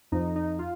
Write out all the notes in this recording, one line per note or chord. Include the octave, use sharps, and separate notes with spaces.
F2 F3 D#4
D#4
F4